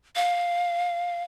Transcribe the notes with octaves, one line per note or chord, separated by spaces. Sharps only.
F5